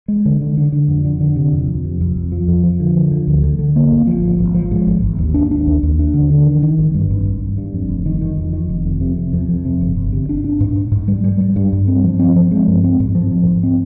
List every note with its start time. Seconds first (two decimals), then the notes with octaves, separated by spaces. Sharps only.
0.08 G#3
0.25 D3
0.41 D3
0.57 D3
0.72 D3
0.88 F2
1.05 D3
1.21 D3
1.36 C3
1.52 F2
1.68 F2
1.84 C3
2.01 F2
2.16 F2
2.32 F3
2.48 F2
2.63 F3
2.80 D3
2.96 F3
3.12 D3
3.27 D2
3.43 D3
3.59 D3
3.76 A#3
3.91 G#1
4.07 F3
4.23 G#1
4.39 G#1
4.54 F3
4.71 G#2
4.87 G#1
5.03 G#1
5.18 D#2
5.34 D4
5.51 D4
5.67 D#2
5.83 D#2
5.99 D4
6.14 D3
6.30 D4
6.47 D#3
6.62 D#3
6.78 G#1
6.95 G2
7.10 G#1
7.26 G#1
7.41 G#1
7.58 G2
7.73 F2
7.89 F1
8.06 D#3
8.21 D#3
8.37 F2
8.53 D#3
8.69 F1
8.86 F2
9.01 C3
9.18 C3
9.33 F2
9.49 F2
9.65 C3
9.81 G1
9.97 G1
10.13 C3
10.29 D4
10.44 D4
10.60 G#2
10.76 G#2
10.92 G#2
11.08 G3
11.24 G3
11.41 G3
11.56 G2
11.73 G2
11.87 C4
12.04 F3
12.19 C4
12.36 F3
12.52 G#3
12.68 G2
12.84 C4
13.00 G#2
13.15 F3
13.31 G#2
13.47 G#2
13.63 C4